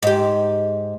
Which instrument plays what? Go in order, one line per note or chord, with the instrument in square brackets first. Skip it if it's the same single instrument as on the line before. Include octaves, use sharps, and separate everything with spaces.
[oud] G#2 G4